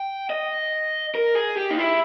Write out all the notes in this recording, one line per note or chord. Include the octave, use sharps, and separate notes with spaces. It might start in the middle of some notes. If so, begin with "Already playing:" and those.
Already playing: G5
D#5
A#4
G#4
G4
D#4
E4